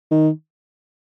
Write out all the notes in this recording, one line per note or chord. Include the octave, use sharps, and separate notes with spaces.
D#3